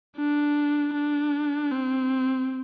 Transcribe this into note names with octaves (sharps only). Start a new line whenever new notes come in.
D4
D4
C4